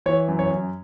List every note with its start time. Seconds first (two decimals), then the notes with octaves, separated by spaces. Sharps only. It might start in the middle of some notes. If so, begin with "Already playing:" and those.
0.06 E3 C#5
0.28 F#2
0.39 C#5
0.51 F#2